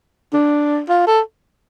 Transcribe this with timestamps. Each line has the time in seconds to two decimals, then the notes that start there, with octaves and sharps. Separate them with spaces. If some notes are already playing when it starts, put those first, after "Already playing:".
0.33 D4
0.89 F4
1.07 A4